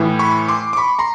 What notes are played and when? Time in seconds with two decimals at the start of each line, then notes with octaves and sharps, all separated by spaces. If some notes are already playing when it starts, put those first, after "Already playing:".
Already playing: A2 E3
0.19 B5 C#6
0.48 C6 D6
0.73 D6
0.77 B5 C#6
0.99 A#5 C6